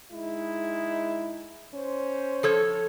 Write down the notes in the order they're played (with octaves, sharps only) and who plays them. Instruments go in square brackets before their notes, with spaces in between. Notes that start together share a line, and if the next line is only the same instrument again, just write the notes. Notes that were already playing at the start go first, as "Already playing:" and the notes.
[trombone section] G#3 D#4 E4
C#4 C5
[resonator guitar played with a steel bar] F3 A4 C#5